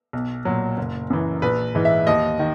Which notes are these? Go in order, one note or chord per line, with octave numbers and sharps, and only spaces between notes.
B1
A#2 F#3
F#1
F#2 E3
A#1 B4
G#2 E3
E5
D#2 D#5
D#3